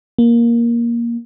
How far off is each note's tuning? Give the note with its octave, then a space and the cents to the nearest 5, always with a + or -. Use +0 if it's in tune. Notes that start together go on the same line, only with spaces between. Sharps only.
A#3 +10